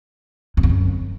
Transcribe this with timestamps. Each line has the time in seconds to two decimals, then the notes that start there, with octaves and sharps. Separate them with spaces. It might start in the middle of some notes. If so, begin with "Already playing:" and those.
0.57 F2
0.63 E2
0.69 F#2